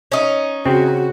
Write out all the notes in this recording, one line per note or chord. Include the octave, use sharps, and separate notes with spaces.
C#4 D#4
C#3 C4 F#4